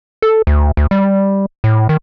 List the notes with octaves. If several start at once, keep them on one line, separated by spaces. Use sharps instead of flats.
A4
D2
D2
G3
A2
D#3